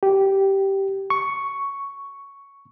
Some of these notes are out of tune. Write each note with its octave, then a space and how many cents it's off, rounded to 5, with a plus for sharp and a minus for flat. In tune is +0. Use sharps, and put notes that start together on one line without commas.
G4 -10
C#6 +5